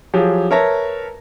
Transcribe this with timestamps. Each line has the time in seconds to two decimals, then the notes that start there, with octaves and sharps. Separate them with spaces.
0.14 F3 F#3 G4 G#4
0.51 A#4 B4 C#5 E5 A5 A#6